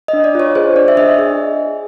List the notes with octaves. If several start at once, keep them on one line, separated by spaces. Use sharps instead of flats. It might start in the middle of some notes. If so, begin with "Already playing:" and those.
D#5
D4
D5
F4 C#5
G#4 C5
D4 D5
E5
D4 D#5
G#4